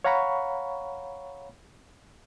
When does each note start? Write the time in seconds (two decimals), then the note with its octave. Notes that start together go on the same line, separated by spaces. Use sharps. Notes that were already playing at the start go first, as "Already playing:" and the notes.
0.05 C#5 F5 F#5 A#5 B5 C#6